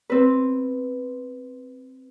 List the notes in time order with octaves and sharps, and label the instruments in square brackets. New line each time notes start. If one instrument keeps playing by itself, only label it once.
[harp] C4 B4